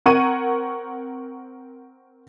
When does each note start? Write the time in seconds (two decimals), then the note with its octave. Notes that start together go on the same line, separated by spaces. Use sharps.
0.06 C4 A#4 F#5 C#6 G#6 D#7